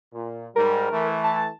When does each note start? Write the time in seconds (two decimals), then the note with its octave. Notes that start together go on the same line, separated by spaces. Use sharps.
0.13 A#2
0.56 G#2 G3 A#4
0.91 E3 A3
1.24 A5